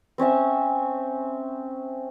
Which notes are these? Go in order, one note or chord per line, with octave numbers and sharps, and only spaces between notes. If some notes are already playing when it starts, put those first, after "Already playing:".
C4 C#4 C#5 E5